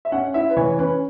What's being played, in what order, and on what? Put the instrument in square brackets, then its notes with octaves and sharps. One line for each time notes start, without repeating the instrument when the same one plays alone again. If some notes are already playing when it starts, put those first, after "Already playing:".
[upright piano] E5
[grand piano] C#4 [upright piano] F#5
[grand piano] E4 [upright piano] E5
[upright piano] B4
[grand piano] E3 [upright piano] C#5
[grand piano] C#4 [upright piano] B4